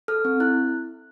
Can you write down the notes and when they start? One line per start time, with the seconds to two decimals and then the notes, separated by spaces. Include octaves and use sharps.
0.08 A4 F6
0.25 C4
0.40 E4 F#6